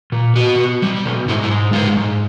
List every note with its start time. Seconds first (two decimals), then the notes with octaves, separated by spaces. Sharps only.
0.12 A#2
0.36 B2 F#4
0.59 B2
0.82 G3
1.05 B2
1.28 G#2 E4
1.43 E4
1.51 G#3
1.73 G#2 F4
1.97 G#2